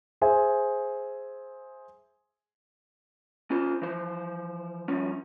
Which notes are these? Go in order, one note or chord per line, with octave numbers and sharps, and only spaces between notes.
G#4 C5 E5 G#5
C#4 F4 C5
E3 F3 C5
G2 F3 C#4